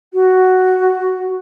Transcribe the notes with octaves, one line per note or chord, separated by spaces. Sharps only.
F#4